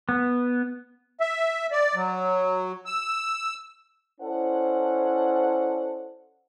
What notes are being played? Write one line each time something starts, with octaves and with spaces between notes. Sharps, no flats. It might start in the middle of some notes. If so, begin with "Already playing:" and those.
B3
E5
D5
F#3
E6
C#4 E4 A4 C5 D5 F#5